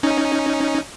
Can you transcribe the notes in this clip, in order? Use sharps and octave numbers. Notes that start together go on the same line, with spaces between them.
C#4 D#4